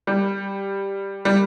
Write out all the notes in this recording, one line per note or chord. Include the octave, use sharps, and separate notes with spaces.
G3
G3